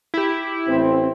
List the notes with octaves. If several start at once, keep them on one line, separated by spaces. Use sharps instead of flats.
E4 G4
A1 C4